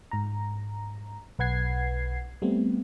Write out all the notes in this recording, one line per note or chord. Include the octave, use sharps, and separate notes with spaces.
G#2 A#5
B1 B4 F#5 G#6 C7
G3 A3 B3 C4